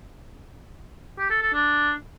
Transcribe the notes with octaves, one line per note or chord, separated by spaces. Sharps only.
G4
A4
A4
D4